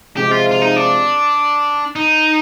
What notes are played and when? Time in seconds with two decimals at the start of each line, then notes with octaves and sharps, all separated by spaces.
0.17 C3 F3 G#3 G4
0.31 F4
0.51 F4
0.62 D#4
0.76 D4
1.96 D#4